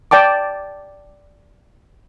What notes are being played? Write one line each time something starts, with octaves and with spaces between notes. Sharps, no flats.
D5 G5 A5 D6